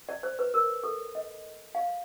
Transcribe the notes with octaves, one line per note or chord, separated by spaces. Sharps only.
D5
C5
B4
A#4
A4
D#5
F5